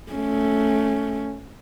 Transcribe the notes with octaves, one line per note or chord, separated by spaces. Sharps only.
A3 C#4